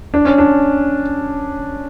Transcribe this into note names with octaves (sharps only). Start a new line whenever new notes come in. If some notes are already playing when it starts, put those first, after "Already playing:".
D4
C#4
D4